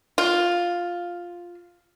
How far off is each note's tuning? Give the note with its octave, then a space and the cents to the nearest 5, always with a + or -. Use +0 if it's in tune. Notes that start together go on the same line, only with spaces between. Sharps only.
F4 +5